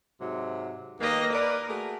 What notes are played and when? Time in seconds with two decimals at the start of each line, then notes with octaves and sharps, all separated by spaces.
0.21 G#2 C3 F#3
1.00 D#2 A#3 D#4 B4 D#5
1.34 A#4 B4 D5
1.69 A3 F#4 G#4